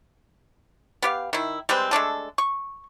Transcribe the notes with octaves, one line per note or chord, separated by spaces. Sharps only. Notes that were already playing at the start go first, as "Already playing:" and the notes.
B3 G4 F5
D#3 E4
G3 G#3 C4 B4
G#3 A3 D4 A4
C#6